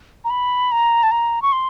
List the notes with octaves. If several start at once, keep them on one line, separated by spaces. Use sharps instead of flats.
A#5
B5
A#5
A5
A#5
C#6
C6